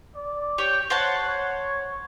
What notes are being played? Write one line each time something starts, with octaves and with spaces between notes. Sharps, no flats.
D5
G4 C#5 G5
C5 C#5 F#5 A5
C#5